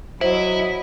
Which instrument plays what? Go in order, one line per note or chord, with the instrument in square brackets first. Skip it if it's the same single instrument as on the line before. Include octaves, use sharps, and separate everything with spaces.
[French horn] F#3 [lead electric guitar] E4 [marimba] C5 [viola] D#5 B5